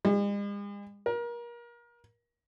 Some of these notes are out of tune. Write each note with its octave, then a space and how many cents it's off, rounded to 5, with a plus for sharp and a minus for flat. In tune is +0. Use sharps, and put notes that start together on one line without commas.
G#3 -45
A#4 +30